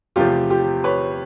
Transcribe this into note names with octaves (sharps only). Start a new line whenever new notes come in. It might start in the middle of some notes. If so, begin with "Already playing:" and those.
E2 C3 F3 A3 F4 G4
F4 G4
B4 C#5